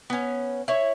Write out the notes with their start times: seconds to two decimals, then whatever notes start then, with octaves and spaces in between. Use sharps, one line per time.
0.10 B3 C#4
0.68 E4 C#5